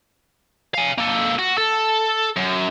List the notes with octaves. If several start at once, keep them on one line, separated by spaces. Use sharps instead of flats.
F5 G#5
A#3 A4
F#4
A4
F#2